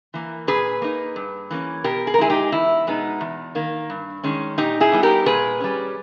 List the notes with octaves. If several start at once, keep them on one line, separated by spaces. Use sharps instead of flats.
E3 A#3
A#2 G#4 B4
A#3 D#4
G2
E3 A#3 C#4
B2 G4 A#4
G#4
A#4
G#3 D#4 E4 G#4
D#4 G4
E2 E4
B2 G#3 B3 D#4
E2
D#3 A#3
G2
D#3 G#3 C#4
A#2 D#4 G4
E4 G#4
G3 B3 D#4
G4 A#4
A#2 G#4 B4
G3 C#4